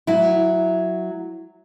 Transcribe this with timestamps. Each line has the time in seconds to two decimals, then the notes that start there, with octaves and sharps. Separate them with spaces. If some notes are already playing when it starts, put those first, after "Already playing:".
0.07 F#3 E4